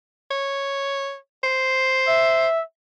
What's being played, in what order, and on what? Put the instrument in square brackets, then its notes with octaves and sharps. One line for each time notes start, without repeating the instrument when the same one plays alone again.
[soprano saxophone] C#5
C5
[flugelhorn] E5